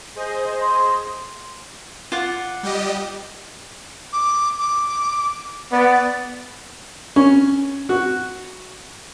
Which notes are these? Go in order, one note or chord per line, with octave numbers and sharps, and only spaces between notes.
G#4 C5 D#5
C6
F4 D5 F#5
G3 G4 D#5
D6
D6
B3 D5
C#4
F#4